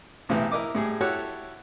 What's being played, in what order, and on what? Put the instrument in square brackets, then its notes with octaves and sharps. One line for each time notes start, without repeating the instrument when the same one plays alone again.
[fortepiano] B1 A2 C3 E3
E4 A#4 D#5 D6
A2 G3 G#4
E4 F#4 G4 A4 C#5 F#5